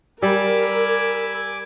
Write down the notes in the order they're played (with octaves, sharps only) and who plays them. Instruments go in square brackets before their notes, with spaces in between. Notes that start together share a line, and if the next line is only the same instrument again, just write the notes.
[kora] G3 G4 [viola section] A#4 [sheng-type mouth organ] G#5 D6 [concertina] B5 E6